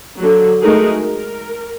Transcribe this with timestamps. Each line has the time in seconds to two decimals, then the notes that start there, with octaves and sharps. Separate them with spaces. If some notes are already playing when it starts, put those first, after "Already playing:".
0.17 D3 F#3
0.62 G#3 A3 D#4 F#4 G#4 A#4
1.02 A#4